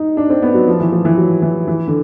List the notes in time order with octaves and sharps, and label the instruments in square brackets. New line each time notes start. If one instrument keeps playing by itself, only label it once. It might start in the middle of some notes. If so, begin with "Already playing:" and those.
Already playing: [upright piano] D#4
D4
C4
B3
F#3
F3
E3
F3
E3
F#3
E3
E3
D3